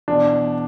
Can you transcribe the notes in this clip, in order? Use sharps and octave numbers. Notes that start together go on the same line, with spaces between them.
E2 B2 D4